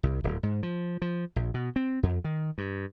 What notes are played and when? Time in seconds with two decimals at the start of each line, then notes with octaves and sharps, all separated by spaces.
0.03 C2
0.24 D1
0.43 G#2
0.63 F3
1.02 F3
1.36 A#1
1.54 B2
1.76 C4
2.03 F2
2.24 D#3
2.58 G2